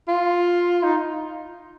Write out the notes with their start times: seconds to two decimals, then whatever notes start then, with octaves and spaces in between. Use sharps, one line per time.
0.08 F4
0.83 D#4